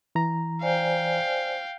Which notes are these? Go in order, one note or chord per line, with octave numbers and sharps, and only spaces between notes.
E3 A#5
C5 D5 F5 G5 G#5